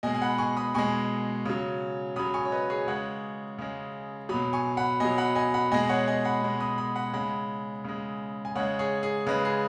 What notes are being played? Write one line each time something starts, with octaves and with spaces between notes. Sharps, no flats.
B2 G#3 D#5 G#5
G#5
F#5 B5
G#5 C#6
B5 D#6
B2 G#3 G#5 C#6
C#3 F#3
C#3 F#3 B5 D#6
G#5 C#6
C#5
B4 D#5
G#4 C#5
C#3 G#3 C#5 F#5
C#3 G#3
B2 F#3 B5 D#6
G#5 C#6
F#5 B5
B2 F#3 D#5 G#5
F#5 B5
D#5 G#5
F#5 B5
B2 G#3 D#5 G#5
C#5 F#5
D#5 G#5
F#5 B5
B2 G#3
B5 D#6
B5 D#6
F#5 B5
C#3 G#3 F#5 B5
C#3 G#3
G#5
C#3 G#3 C#5 F#5
G#4 C#5
G#4
C#3 G#3 B4
G#4